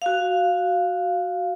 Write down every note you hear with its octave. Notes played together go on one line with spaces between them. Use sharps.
F#4 F5